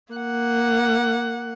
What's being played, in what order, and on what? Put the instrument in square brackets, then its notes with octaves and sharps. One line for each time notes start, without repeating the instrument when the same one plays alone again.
[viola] A#3 F#5